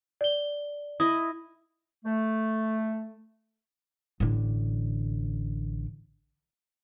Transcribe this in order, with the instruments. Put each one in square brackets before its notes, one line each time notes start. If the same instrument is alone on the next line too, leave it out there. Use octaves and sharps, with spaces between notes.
[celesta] D5 G7
[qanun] E4 D#5 [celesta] D#6
[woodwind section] A3
[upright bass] A1 D3